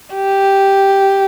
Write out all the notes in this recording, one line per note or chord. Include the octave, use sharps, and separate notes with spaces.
G4